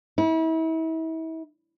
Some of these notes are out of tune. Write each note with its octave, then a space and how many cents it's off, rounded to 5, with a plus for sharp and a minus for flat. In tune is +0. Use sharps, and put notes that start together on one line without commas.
E4 -35